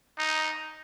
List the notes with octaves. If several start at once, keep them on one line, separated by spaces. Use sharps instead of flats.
D#4